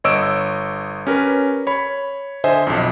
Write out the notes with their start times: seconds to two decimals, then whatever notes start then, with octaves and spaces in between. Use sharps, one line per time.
0.04 G1 C#5 D#5 C#6 E6 D7
1.07 C#4 G4 A#4 B4
1.67 C#5 B5
2.44 D3 C5 D#5 E5 G#5
2.67 B1 F2